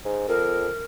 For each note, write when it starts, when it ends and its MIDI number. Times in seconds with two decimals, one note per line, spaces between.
0.05 0.24 44
0.28 0.68 41
0.28 0.85 70